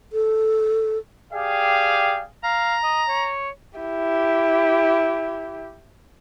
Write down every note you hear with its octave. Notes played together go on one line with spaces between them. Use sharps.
A4
G4 G#4 D5 F5 G5
F5 A#5
D#5
C#5
E4 G4